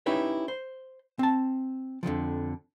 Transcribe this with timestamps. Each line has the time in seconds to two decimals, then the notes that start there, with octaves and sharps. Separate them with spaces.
0.06 C#4 D#4 E4 G4 B4 C#5
0.48 C5
1.19 C4 A5
2.03 F2 D3 D#3 F3